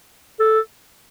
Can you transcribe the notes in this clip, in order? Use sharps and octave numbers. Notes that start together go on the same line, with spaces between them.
A4